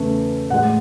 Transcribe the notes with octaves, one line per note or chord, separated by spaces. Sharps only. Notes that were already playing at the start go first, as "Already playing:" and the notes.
Already playing: E2 C#3 E3 A3
A2 E3 G#3 F#5